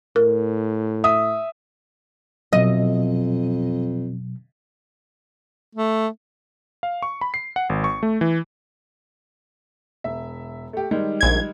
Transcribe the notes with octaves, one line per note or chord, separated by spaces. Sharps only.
A2 A#4
E5 D#6
F2 B2 F#3 D#5
A3
F5
C#6
B5
C7
F#5
G#1
C#6
A3
E3
E1 E5
A3 G4
D#3 G3 G#3
A#1 G#6